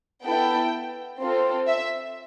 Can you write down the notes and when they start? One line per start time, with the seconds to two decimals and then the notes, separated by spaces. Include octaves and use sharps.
0.24 B3 E4 A4 G5
1.21 C4 F4 A4
1.68 E5